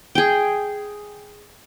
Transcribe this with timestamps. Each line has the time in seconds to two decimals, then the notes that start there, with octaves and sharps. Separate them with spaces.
0.15 G#4 G5